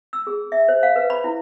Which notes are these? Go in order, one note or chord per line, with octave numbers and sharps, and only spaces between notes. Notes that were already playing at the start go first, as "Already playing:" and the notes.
E6
G#4
E5
C5
F5
B4
B5
E4